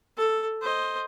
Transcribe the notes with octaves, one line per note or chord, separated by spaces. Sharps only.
A4
C5 D#5